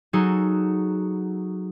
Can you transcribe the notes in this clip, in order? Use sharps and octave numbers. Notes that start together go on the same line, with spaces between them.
F#3 D#4 F#4 G#4 A4